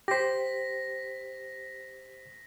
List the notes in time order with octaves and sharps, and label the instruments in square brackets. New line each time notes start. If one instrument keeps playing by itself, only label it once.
[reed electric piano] G4 C5 [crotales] A#6 B6